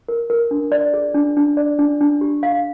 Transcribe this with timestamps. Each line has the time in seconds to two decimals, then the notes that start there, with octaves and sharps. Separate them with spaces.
0.08 A#4
0.30 A#4
0.51 D4
0.72 D5
0.94 G#4
1.15 D4
1.37 D4
1.57 D5
1.79 D4
2.01 D4
2.21 G4
2.43 F5